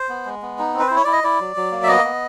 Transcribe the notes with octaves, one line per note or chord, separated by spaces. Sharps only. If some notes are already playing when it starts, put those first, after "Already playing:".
Already playing: C5
B3
G#3
B3
D#4
C4
B4
E4 C5
C#5
E4 D5
D#5
E4 D5
F#3
F#3
A#3
E5
B3 D#5
B3